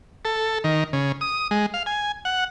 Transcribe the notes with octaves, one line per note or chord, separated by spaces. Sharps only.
A4
D#3
C#3
D#6
G#3
F5
G#5
F#5